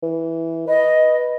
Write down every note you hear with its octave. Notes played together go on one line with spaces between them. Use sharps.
E3
B4 D#5